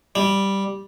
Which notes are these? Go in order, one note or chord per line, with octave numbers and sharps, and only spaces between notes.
G3